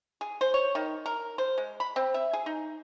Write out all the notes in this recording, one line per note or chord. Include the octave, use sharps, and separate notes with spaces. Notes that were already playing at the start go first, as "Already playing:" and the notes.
G#4
C5
C#5
D#3
A#4
C5
G#3
B5
C4
E5
G#4
D#4